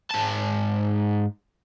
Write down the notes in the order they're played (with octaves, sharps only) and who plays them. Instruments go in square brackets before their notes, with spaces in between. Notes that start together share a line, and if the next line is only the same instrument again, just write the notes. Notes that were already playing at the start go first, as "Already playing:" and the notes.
[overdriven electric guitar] G#2 A5